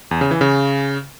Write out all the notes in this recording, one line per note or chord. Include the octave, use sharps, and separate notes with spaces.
E2
C#3
E3
C#3